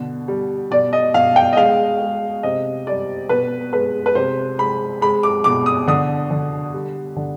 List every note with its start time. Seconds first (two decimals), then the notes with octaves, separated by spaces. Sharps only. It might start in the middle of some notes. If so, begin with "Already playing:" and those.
Already playing: B2 D3
0.28 G3
0.71 B2 D5
0.93 D#5
1.14 B2 F5
1.36 G5
1.53 D#5
1.57 G#3 F5
2.01 G#3
2.43 C3 D#5
2.87 G3 D5
3.29 B2 B4
3.73 G#3 B4
4.06 B4
4.15 C3 C5
4.59 G#3 B5
5.01 G#3 B5
5.23 D6
5.44 B2 D6
5.66 D#6
5.87 D3 D#6
6.31 D3
6.74 G3
7.16 D3